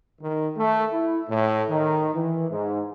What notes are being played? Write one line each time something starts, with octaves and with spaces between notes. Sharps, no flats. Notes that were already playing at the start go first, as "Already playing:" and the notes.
D#3
A3
E4
A2
D#3
E3
G#2